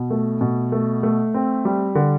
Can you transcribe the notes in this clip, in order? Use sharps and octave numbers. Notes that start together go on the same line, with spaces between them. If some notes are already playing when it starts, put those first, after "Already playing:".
Already playing: B2
A3
B2
A3
A3
C4
G3
D3